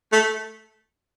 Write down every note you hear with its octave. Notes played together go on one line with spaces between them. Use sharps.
A3